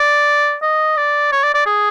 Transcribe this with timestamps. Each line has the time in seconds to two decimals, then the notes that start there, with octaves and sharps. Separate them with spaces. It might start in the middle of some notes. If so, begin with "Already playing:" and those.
Already playing: D5
0.62 D#5
0.97 D5
1.32 C#5
1.44 D5
1.54 D5
1.66 G#4